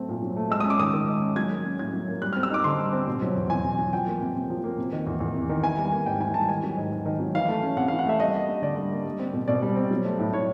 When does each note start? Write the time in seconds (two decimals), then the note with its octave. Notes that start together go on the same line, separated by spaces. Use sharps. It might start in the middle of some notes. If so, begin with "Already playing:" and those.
Already playing: F#3 A3 C4
0.09 A#2
0.22 F#3
0.36 A3
0.50 G#3 E6
0.60 C#4 D#6
0.70 D6
0.79 D#3 D#6
0.94 D#3
1.08 G#3
1.22 C#4
1.36 F#3 G#6
1.51 A#3
1.64 C#4
1.79 A2 G#6
1.93 F#3
2.08 A#3
2.21 G3 F#6
2.33 C4 F6
2.43 E6
2.50 D#4 D6
2.64 D3 C6
2.78 G3
2.93 C4
3.08 B2
3.22 F#3
3.36 E2
3.50 E2 G#5
3.65 B2
3.79 F#3
3.93 F3 G5
4.07 A#3
4.21 C3
4.35 C3
4.50 F3
4.64 A#3
4.78 C3
4.92 D#3
5.07 E2
5.20 E2
5.35 C3
5.49 D#3
5.63 E3 G#5
5.78 G3
5.92 A#3
6.06 G#2 G5
6.20 E3 G#5
6.34 G3 A5
6.49 D#3 G#5
6.63 F#3
6.77 G#2
6.92 G#2
7.06 D#3
7.20 F#3
7.35 E3 F5
7.49 A3
7.62 C#4
7.76 C3 F#5
7.88 E3 F5
7.99 F#5
8.06 A3 E5
8.20 G3 D#5
8.35 A#3
8.48 D4
8.62 D3 D5
8.76 G3
8.91 A#3
9.05 G3
9.19 C4
9.33 B2
9.48 B2 D5
9.62 G3
9.76 C4
9.91 F#3
10.05 A3
10.19 A2
10.33 A2 C#5